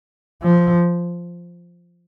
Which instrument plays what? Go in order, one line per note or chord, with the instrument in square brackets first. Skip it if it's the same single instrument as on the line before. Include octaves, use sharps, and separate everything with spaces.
[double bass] F3